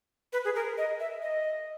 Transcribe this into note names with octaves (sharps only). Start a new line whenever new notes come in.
B4
G#4
A#4
D#5
E5
D#5